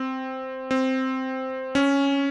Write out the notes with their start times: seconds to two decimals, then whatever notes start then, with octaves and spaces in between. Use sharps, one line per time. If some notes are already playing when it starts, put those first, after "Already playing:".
Already playing: C4
0.71 C4
1.75 C#4